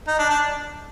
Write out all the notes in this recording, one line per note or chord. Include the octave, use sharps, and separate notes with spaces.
D#4
D4
D4